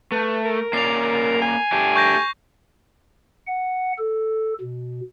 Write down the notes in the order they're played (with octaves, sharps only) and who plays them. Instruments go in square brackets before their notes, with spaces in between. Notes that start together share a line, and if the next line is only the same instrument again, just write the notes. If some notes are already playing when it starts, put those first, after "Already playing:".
[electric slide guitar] A3 [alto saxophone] B4
[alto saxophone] A#4
[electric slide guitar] A#3 C#4 D5 [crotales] C7 F7
[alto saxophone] G#5
[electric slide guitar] A3 D4 G4
[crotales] C#6 G6 A#6
[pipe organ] F#5
A4
B2